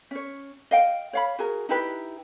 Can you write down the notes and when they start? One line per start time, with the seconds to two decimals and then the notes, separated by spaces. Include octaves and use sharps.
0.11 C#4 C#5
0.71 D#5 F5 G5
1.13 C#5 F5 B5
1.39 F#4 G#4 A#4
1.69 D#4 E4 G4 B4